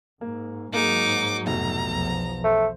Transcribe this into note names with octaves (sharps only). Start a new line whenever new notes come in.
G#2 A#3
G#2 F#3 A#3 D#4 G#4 D6
F1 B2 A#5
B1 E2 F3
A3 C5